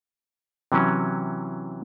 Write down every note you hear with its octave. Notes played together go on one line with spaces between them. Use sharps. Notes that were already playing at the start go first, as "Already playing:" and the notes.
C3 E3 F#3 C#4